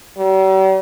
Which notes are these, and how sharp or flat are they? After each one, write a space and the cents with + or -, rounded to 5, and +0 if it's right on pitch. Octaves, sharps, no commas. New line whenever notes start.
G3 -45